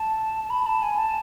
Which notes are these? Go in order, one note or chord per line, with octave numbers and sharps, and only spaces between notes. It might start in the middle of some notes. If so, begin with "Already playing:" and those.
Already playing: A5
A5
B5
A5
G#5
A5